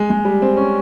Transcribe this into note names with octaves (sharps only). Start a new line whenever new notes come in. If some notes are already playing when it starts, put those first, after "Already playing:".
Already playing: G#3
G#3
G3
C4
C#4